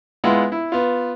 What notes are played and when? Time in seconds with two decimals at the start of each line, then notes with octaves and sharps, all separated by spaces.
0.24 G#3 B3 E4 F4 F#5
0.52 E4
0.72 B3 F4